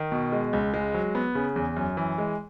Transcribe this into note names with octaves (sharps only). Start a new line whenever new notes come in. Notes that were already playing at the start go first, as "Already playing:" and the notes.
Already playing: D#3
B2
G#3
C#2
G#3
F#3
B3
C#3
E2
F#2
E3
G#3